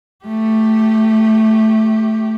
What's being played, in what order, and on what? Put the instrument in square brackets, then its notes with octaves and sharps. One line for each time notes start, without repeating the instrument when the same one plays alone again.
[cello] A3 G4